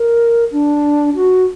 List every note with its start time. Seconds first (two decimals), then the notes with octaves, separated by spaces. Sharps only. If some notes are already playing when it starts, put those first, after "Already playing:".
Already playing: A#4
0.52 D4
1.15 F#4